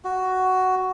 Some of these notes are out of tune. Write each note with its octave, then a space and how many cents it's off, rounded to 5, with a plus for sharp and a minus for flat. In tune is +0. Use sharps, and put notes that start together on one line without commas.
F#4 +10